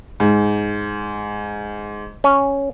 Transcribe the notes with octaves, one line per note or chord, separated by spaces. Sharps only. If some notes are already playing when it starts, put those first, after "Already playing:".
G#2
C#4